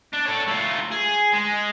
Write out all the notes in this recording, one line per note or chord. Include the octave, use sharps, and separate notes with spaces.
D4
A4 C#5
A3 F4
G#4
G#3